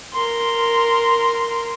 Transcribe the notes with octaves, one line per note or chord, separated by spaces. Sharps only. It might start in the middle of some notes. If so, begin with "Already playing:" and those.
A#4 C6